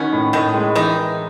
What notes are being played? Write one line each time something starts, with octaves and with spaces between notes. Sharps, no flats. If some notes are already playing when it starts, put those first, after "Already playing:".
Already playing: B2 D#3 B3 C#4
A2
A2 D#3 D#4
G#3
D#3 E3 D#4
E3